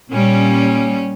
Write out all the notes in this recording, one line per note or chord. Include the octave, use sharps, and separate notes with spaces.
A#2 G3 C#4